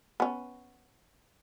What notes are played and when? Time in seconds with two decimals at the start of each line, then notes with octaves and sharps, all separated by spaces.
0.20 B3 C#4